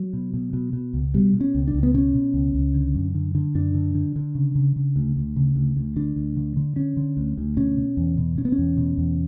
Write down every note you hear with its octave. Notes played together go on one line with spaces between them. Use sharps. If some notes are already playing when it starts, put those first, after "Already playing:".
Already playing: F#3
B2
B2
B2
B2
C#2
B2 G3
B2
C#4
C#2
D4
C#2
B3
B2 C#4
B2
C#2
C#2
D3
F#2
D3
D3
F#2 D4
D3
D3
D3
C#3
C#3
C#3
D2
D2
C#3
D2
D2
D3 D4
D2
D3
D3
D3 C#4
D3
D2
D2
B2 C#4
B2
E2
B2
B2 C#4
B3
C#4
E2
B2
E2